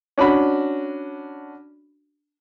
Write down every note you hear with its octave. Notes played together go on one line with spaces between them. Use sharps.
C#4 D4 F#4 B5